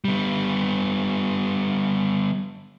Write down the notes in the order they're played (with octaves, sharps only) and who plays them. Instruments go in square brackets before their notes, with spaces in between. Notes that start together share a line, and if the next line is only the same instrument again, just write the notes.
[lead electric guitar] G3 B3